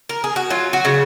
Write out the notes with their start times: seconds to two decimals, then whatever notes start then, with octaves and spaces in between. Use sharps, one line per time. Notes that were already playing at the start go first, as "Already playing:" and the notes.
0.09 A#4
0.24 G#4
0.36 F#4
0.50 F#3 F4
0.73 F#4
0.85 C#3